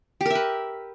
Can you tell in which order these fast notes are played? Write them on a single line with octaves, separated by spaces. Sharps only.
G4 A#4 E5 B4